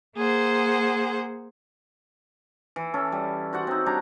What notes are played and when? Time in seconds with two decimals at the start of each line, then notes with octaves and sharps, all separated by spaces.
0.16 A#3 G#4 C5 F#5
2.76 E3
2.94 C#4 A4
3.12 G3
3.53 F#4 C5 D5 F#5
3.67 C4 D#4
3.86 G3 D4 C#5 A#5